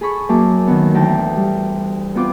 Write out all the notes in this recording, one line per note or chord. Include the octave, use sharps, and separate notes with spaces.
G#4 A4 B5 C#6
F#2 A#3 A5 D6
D#3 B3
D2 E3 B4 G5 A5 A#5
G3
B3 C4 F4 D6